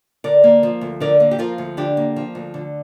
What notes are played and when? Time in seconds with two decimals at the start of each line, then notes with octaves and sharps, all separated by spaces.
0.24 D3 A#4 D5
0.44 A#3
0.63 F3
0.81 D2
1.00 D3 A#4 D5
1.20 A#3
1.31 G4
1.39 F3 F4 A#4
1.58 D2
1.77 D3 D4 G4
1.97 A#3
2.16 F3
2.35 D2
2.54 D3